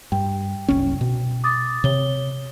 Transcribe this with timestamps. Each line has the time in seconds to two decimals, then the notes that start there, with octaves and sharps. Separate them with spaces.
0.12 G2 G5
0.68 F#1 C2 C#4
1.01 B2
1.44 D6 D#6 A6
1.84 C3 C#5 G7